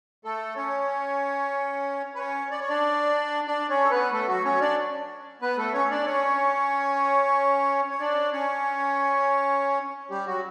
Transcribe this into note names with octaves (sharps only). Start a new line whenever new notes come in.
A3 A4
C#4 C#5
B4
C#4 C#5
D5
C#5
D4 D5
D4 D5
C#4 C#5
A4
B3 B4
A3 A4
F#3 F#4
C#4 C#5
D4 D5
B3 B4
A3 A4
C#4 C#5
D4 D5
C#4 C#5
C#5
D4 D5
C#4 C#5
G3 G4
F#3 F#4